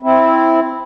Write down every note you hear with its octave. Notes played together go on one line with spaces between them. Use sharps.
C4 E4